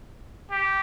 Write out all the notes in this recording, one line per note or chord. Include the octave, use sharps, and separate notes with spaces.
G4